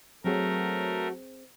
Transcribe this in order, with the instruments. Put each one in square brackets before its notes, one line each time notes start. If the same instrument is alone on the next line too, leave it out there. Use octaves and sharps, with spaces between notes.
[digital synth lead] F#3 [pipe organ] A3 A#4 [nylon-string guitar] C4 G#4